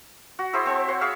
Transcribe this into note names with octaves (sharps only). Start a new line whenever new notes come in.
F#4
E4 G#4 C5 E5
C4 C5 A5
C#5 F#5 C6
G#4 C#5 E5 F5